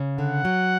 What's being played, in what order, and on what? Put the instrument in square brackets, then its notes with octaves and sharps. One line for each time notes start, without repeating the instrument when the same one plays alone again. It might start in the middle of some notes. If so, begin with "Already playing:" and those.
Already playing: [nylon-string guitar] C#3
[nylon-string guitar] D3 [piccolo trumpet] F#5
[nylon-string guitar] F#3